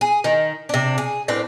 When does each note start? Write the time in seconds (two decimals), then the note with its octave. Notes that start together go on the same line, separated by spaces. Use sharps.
0.01 G#4
0.24 D#3
0.69 C3 D4
0.98 G#4
1.28 A2 C4 D4 B4